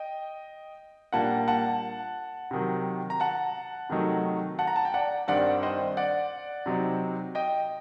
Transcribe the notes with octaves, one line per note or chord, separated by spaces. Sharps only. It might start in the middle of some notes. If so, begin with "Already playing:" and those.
Already playing: D#5 G5
A#2 G3 A#3 D4 F#5 A5
F#5 A5
C3 D#3 F#3
A#5
F#5 A5
C3 D#3 F#3 A3 D#4
F#5 A5
A#5
A5
G5
D5 F#5
G2 D#3 G3 C4 D5 F#5
C5 D#5
D5 F#5
C3 F#3 C4 D#4
D#5 G5